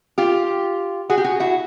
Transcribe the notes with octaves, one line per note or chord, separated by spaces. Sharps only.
F4 G4
F#4 G#4
G4
F#4 G#4
E4 F#4